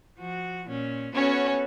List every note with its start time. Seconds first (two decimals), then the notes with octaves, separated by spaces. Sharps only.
0.18 F3 F#4
0.68 A#2 C#4
1.15 B3 C#4 F#4 A4 C#5